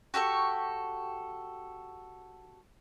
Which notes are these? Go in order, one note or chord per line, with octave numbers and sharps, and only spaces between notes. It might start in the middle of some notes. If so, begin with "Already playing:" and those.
F#4 G4 A4 C#6